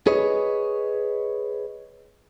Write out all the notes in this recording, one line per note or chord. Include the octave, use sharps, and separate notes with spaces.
G#4 B4 C#5 D#5